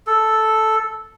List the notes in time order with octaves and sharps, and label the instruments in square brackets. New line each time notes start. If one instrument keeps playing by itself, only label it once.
[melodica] A4